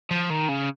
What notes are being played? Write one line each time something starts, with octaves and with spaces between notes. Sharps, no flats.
F3
D#3
C#3